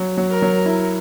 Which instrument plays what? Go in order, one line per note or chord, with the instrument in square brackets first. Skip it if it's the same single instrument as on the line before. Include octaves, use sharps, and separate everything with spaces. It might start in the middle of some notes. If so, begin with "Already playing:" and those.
Already playing: [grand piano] F#3
F#3
[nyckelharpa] A#4
[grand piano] F#3
E4